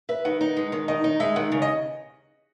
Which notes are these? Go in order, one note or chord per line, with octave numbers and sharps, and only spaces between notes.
B4 E5
D#3 F#5
D#4
G#3
D#3
D#3 D#5
D#4
G#3 E5
D#3 F#5
C#3
D#5